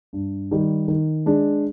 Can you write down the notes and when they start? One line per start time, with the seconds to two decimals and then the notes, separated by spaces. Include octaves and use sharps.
0.13 G2
0.51 D#3 G3
0.88 D#3
1.26 G#3 D4